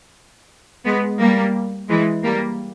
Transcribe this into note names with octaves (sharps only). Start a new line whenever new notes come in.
G#3 B3
G3 A#3
E3 G#3
G3 A#3